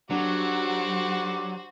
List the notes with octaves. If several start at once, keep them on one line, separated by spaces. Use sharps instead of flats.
F#3 G3 D4 F#4 C5 F#5 D6